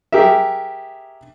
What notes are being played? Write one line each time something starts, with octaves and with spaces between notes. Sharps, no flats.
G4 G#4 A#4 E5